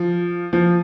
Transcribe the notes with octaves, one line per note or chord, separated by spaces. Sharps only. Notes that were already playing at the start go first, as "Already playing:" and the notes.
Already playing: F3
F3